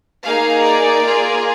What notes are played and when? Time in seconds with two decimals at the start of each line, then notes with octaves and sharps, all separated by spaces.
0.24 A#3 D#4 G#4 F5
0.63 D5
1.03 A#3 F4 G#4